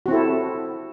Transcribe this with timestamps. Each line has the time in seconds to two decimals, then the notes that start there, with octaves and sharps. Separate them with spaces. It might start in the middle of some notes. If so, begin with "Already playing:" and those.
0.06 F#4
0.08 C4
0.11 E4
0.13 A4